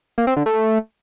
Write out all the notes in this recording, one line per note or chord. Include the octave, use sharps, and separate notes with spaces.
A#3
C4
D3
A3